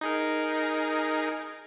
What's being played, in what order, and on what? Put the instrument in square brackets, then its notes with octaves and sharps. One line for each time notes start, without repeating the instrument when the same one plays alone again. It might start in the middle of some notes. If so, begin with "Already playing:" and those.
[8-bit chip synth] D#4 G#4 A#4